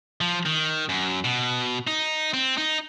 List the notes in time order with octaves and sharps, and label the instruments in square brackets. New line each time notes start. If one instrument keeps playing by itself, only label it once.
[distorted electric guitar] F3
D#3
F#2
B2
D#4
C4
D#4